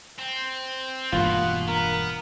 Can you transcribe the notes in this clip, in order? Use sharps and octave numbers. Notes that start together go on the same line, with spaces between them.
C4
E1 G2 B2 A#3 F4 F#5
B3 A#4